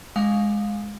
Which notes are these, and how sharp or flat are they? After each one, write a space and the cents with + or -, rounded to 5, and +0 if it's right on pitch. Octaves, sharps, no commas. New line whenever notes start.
G#3 +0 F5 +20